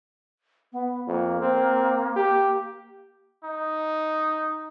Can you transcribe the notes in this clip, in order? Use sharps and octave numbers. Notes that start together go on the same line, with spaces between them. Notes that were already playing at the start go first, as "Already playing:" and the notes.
B3
F2 A#3
C4
G4
D#4